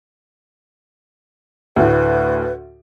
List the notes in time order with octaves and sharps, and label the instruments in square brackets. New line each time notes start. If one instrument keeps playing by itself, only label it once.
[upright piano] D2 A2 [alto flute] B4